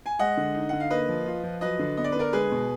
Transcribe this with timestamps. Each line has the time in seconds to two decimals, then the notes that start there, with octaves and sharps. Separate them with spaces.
0.06 G#5
0.19 G#3 D#5 F#5
0.37 D3
0.55 D#4
0.69 D3 F#5
0.80 F5
0.90 A#3 B4 D#5
1.09 F3
1.26 F4
1.43 F3
1.61 F#3 B4 D#5
1.79 D3
1.97 B3 D#5
2.04 D5
2.12 B4
2.16 D3 A#4 D5
2.33 G#3 G#4 B4
2.51 B2